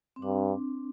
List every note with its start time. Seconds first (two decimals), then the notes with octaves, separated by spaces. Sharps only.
0.16 C4
0.22 G2 D4